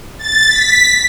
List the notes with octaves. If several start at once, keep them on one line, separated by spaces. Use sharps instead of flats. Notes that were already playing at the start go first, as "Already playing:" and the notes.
A6
B6